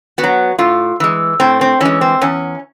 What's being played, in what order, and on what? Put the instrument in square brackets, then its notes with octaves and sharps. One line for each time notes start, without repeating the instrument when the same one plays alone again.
[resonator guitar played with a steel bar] B3 F#4
F#3
A2 F4
E3 G#3
A2 C4
C4
E3 G#3 C#4
C4
E2 C#4